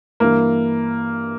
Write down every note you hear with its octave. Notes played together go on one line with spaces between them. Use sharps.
G2 E3 A#3